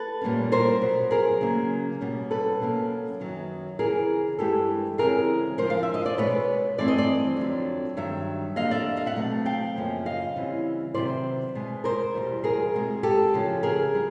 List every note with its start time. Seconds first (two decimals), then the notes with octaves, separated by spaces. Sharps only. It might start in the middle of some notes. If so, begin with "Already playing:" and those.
Already playing: A4 B4
0.21 A#2 G3 A#3 C#4
0.52 A#4 C5
0.81 B2 F#3 B3
1.11 G#4 A#4
1.41 C#3 F#3 A#3 C#4
2.01 B2 G3 A#3 C#4
2.31 A4 B4
2.60 B2 F#3 A#3 C#4
3.20 F#2 D#3 F#3 B3
3.79 F2 C#3 E3 G#4 A#4
4.39 G2 E3 G#3 B3 G4 A4
4.98 C#3 E3 G#3 C4 G#4 A#4
5.58 D3 F3 G#3 A#4 C5
5.70 F5
5.83 E5
5.94 D#5
6.06 D5
6.17 B2 G#3 B3 B4 C#5
6.78 G2 E3 A3 C4 D5
6.88 D#5
6.98 C5 D5
7.37 F2 D3 F#3
7.97 G2 D#3 F#3 E5
8.56 F2 D3 G3 A#3 D#5 F5
8.71 D5 E5
8.97 D#5 F5
9.06 E5 F#5
9.16 B2 F#3 A3 C4
9.46 F5 G5
9.76 F#2 C#3 F3 A#3 C#4
10.06 D#5 F5
10.36 C#3 E3 G3 C4
10.94 C3 D#3 F#3 B3 C5 D5
11.55 B2 G#3 B3
11.84 A#4 C5
12.14 E2 B2 G3
12.44 G#4 A#4
12.74 B2 G#3 C4
13.03 G4 A4
13.33 C#3 F3 G#3
13.63 G#4 A#4
13.93 D3 G3